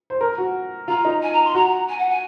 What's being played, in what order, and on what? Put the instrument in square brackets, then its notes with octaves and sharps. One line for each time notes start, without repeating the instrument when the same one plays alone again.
[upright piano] C5
A#4
F#4
[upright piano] F4 [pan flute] A#5
[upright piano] D#4
[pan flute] G#5
A#5
C6
[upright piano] F#4 [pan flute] A#5
[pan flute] G#5
F#5
G#5